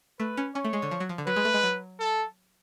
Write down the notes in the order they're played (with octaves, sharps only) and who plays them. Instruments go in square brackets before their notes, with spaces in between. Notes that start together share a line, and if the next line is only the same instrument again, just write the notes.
[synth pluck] A3 [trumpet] B4
[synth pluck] C#4
[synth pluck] C#4 [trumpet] C#5
[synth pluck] A3
G#3
D3
F3
F#3
F3
D3
[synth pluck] F#3 [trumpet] B4
[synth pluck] G#3
A3
G#3
F#3
[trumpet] A4